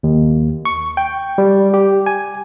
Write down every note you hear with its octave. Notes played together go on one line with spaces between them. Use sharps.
D#2
C#6
G5
G3
G4
G#5